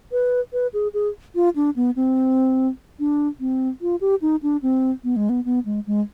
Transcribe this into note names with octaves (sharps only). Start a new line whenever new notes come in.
B4
B4
G#4
G#4
F4
D4
B3
C4
D4
C4
F4
G4
D#4
D4
C4
B3
G#3
B3
B3
G#3
G#3